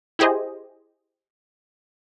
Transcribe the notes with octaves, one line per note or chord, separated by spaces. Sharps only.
E4 G4 G#4 C5 D#5